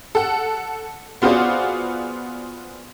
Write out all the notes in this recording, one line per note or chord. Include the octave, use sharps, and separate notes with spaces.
A4 F#5
B3 F4 F#4 G#4 C5 D5